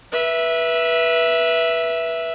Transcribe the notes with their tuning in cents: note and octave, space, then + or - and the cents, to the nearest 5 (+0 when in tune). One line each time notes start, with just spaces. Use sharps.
B4 -25 E5 +0